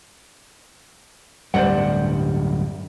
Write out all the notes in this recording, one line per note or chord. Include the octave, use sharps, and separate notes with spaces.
D1 G2 G3 C5 D5 F#5